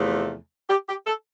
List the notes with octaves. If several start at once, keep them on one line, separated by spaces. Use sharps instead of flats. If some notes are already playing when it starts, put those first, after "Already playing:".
Already playing: E2 C3 F3 A3
G4
G4
A4